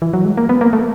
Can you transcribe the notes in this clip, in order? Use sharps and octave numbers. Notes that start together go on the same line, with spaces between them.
E3
F#3
G#3
A#3
B3
A#3
A3